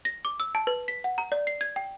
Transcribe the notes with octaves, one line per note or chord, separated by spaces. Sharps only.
A#6
D6
E6
A5
B4
B6
F#5
A#5
D5
C7
G#6
G5